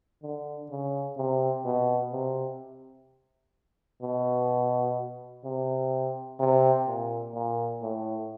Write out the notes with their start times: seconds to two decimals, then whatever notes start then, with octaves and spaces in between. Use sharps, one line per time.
0.22 D3
0.70 C#3
1.17 C3
1.65 B2
2.12 C3
4.02 B2
5.44 C3
6.39 C3
6.87 A#2
7.34 A#2
7.82 A2